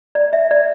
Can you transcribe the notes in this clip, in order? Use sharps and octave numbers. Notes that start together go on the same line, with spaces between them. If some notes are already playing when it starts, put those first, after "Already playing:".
D5
E5
D5